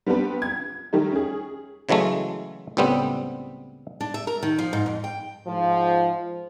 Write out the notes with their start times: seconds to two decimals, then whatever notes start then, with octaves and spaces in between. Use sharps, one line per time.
0.06 G3 B3 C4 D4 B4
0.42 G#6
0.93 D#3 G3 A3 D#4
1.12 C#4 G#4
1.89 C#3 E3 F#3 G#3 A3
2.77 C#2 A2 G3 B3 C4
4.01 D4
4.14 E5
4.27 A#4
4.43 D#3
4.59 F3
4.73 G#2
4.86 F2
5.04 G5
5.47 G#2 F3